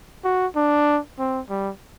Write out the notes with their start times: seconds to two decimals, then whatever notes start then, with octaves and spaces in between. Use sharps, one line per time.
0.24 F#4
0.56 D4
1.19 C4
1.50 G3